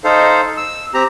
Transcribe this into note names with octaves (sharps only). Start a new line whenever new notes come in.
D#4 A4 C5 F5
E6
C4 G4 A#5